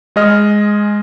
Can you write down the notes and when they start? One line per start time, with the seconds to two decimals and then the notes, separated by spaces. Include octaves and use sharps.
0.16 G#3 G#4 D#5 F6